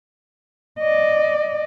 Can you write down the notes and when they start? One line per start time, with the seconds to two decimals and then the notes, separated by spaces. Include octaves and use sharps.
0.79 D5 D#5